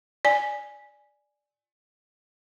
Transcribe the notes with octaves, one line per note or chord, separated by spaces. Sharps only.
D5 G#5